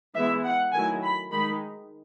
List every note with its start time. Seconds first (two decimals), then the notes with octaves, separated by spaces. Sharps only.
0.16 E3 G#3 B3 E4 E5
0.45 F#5
0.73 D#3 F#3 A3 E4 G#5
1.03 B5
1.32 D#3 G#3 D#4 B5